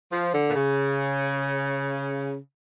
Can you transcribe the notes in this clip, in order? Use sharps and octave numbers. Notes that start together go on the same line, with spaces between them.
F3
D3
A#2
C#3